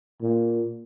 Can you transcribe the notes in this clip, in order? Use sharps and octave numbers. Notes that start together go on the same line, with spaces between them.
A#2